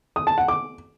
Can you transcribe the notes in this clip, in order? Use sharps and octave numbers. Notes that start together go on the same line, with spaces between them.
D#6
A5
F#5
D6